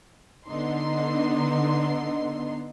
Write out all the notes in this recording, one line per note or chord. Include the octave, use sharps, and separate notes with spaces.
D3 B3 D#4 C6